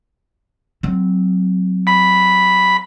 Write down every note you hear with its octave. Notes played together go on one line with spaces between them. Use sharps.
F#3 C4
B5